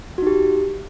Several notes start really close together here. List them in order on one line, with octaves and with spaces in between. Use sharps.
F#4 D#4 G4